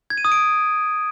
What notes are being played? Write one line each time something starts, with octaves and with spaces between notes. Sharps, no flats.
G#6
D#7
D#6
D7